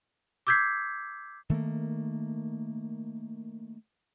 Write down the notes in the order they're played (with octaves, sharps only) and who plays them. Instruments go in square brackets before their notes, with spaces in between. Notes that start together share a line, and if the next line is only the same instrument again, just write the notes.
[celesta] D6 E6 G6 G#6 B6 C7
[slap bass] D#3 A3 A#3